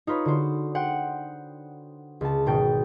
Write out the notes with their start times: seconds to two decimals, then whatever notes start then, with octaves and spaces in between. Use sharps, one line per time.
0.07 D#4 F4 B4 C#5
0.25 D3 F#4 C5
0.75 C5 F#5 G5
2.21 C#2 A5
2.46 G#1 B2 G5 A6